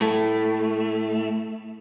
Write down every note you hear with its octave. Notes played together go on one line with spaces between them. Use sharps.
A2 A3